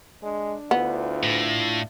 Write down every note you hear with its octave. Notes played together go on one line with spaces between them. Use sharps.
G#3 D4
D2 B3 D4 E4 F4
A2